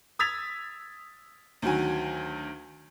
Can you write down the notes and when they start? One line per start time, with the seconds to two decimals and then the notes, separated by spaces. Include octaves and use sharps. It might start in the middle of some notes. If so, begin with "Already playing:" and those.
0.19 D#6 E6 G#6 A6 B6 F7
1.62 D2 D#3 F#3 F#4 G#5